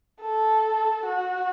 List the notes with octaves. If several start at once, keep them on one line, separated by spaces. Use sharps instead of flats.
A4
F#4